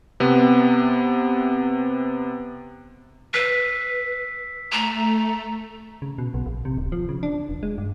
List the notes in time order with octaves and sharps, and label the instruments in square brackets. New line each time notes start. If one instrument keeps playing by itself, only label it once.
[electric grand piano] C3 B3
[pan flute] B4 [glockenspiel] E6 B6 C7
[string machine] A3 [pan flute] A#5
[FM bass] C#3
B2
B1
A#1
C3
D1
F3
C#3
D4
E1
G#3
G2